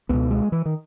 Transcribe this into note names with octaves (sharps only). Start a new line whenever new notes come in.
C#2 B2 B3
G#3
E3
D#3